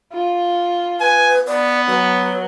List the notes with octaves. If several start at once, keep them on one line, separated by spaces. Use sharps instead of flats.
F4
B4 G#5
B3 D5
F#3 B4